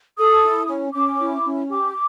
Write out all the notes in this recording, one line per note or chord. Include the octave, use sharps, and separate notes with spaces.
A4 D#6
E4
C#4
C#4 D6
E4
C#4
G4 D6